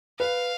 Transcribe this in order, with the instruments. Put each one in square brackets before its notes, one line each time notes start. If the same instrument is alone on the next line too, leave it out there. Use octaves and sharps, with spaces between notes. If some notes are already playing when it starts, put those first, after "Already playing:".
[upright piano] B4 [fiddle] F5